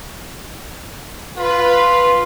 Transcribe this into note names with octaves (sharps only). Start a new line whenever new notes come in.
F4 B4